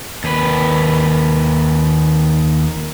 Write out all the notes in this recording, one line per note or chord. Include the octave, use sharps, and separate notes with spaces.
D#2 B4